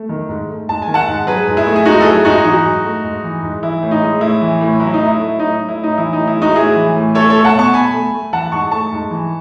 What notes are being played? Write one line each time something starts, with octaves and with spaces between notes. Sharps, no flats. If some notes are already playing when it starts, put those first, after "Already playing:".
Already playing: A3
D#3
G#2
A3
G#2 A5
G#5
D#3
F#5 A5
G#2
F#3 G#4 B4
G#2
E4 G#4
A3
G#4
G#2 D#4 F#4
A4
F#3 E4 G#4
G#2 D#4 F#4
G#4
E3 D#4 F#4
G#2
A3
G#2
E3
G#2
E3 E4
A2
D#4
G#3
A2 E4
E3
A2
F#3 E4
D#4
A2
E4
A3
A2 D#4
F#3
E4
A2
D#4
E3 E4
A2 D#4
E4
G#3 D#4 F#4
A2 E4 G#4
E3
A2
A3 A4 C#5
A3 A4 C#5
F#5 A5
B2 A5 C#6
B2 G#5 B5
A3
A3
E3 F#5 A5
G#2 A5 C#6
A3 A5 C#6
G#2
E3